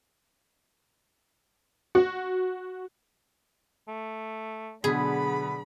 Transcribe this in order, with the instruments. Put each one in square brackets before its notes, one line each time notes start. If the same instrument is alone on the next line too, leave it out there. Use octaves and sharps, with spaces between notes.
[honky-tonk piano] F#4
[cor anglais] A3
[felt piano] B2 D3 B6 [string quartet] F#3 D4 B5 [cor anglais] B3 [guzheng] G#4